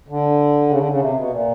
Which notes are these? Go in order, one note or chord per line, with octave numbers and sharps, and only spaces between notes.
D3
C#3
D3
C#3
C3
B2
A#2